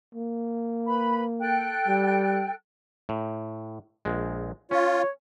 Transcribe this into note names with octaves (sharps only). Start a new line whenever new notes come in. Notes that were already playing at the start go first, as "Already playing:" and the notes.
A#3
B4 B5
A4 G5 F#6
G3
A2
A#1 G#3
C#4 F4 C#5